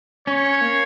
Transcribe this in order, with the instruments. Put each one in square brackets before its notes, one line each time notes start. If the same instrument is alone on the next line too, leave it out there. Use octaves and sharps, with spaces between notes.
[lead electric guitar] C#4 [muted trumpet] C#5
[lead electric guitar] A#3